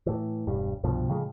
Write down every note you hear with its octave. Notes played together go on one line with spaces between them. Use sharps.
A2 E3
E1 G2 G3
C2 G2 B2 F3
A2 C#3 F3 G#3